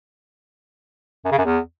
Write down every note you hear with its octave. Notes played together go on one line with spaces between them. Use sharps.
F#2
C#3
F#2
E2